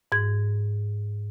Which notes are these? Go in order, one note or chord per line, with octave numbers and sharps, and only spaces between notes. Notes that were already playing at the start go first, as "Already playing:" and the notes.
G#2 G#6